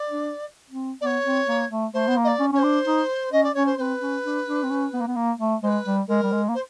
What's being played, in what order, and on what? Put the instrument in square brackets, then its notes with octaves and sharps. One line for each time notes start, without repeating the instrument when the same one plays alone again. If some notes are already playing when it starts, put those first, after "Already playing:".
Already playing: [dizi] D5
[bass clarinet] D4
C4
[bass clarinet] B3 [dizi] C#5 D5
[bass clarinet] C4
A#3
A3
[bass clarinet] A3 [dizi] C5
[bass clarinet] B3
A#3
[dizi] D#5
D5
[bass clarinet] C#4
[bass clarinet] C#4 [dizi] C#5
[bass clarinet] D4 [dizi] C5
[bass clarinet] D#4
[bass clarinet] C#4 [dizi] D#5
[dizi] D5
[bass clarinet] C#4 [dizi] C#5
[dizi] C5
[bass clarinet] C4 [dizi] B4 C5
[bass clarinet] C#4
D4
D4
C4
C#4
B3
A#3
B3
A#3
A3
[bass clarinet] G#3 [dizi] C5
[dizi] B4
[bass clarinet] G3
[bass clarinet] G#3 [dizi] A#4
[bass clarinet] G3
G#3
A#3
[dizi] C5